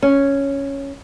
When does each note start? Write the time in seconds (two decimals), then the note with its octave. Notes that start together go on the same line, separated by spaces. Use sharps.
0.02 C#4